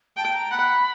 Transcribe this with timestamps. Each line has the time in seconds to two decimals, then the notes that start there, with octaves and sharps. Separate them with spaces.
0.17 G5 A5
0.34 A#5
0.51 F#5 B5